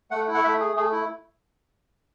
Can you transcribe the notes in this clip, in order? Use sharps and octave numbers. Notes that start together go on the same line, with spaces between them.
A3 F#5
E4
F#5
A3 E5
G#4
A3 G#4
E4